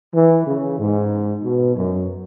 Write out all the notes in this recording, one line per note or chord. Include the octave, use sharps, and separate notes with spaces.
E3
C#3
G#2
B2
F#2